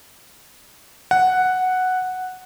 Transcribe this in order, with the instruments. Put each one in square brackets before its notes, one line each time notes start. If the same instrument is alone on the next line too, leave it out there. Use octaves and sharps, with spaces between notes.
[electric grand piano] F#5